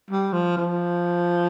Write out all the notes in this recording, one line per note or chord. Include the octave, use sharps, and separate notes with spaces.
G3
F3
F3